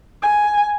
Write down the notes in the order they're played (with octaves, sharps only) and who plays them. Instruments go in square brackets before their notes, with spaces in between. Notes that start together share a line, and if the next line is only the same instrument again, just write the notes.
[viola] G#5